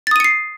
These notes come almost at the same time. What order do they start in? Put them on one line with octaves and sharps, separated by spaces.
A6 D#6 D#7 C#7 C7